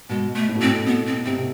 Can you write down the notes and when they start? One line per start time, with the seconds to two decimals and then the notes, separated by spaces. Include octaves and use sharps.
0.09 B2 G#3
0.36 A3
0.48 A2
0.55 B2
0.61 A2 C4
0.87 B2 B3
1.07 C4
1.25 C3 C4